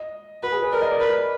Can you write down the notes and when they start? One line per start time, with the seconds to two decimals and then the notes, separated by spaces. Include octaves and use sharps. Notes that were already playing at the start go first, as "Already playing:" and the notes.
Already playing: D#5
0.43 F#4 B4
0.52 G#4
0.62 B4
0.72 A#4 D5
0.82 D#5
0.91 D5
1.00 A#4 B4